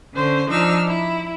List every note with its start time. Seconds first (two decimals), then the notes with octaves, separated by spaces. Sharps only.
0.14 D3 C#4 C5
0.50 F3 D4 D#4 E6 F6
0.87 E4